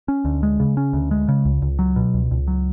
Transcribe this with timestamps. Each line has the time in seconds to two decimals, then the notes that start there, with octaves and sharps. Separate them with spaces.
0.08 C#4
0.25 D2
0.43 G#3
0.60 C#3
0.77 C#4
0.93 D2
1.11 G#3
1.28 C#3
1.45 C#2
1.62 C#2
1.79 F#3
1.96 B2
2.14 C#2
2.31 C#2
2.48 F#3